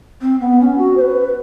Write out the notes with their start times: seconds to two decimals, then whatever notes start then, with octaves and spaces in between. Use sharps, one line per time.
0.22 C4
0.40 B3
0.60 C#4
0.78 F#4
0.97 C5
1.01 B4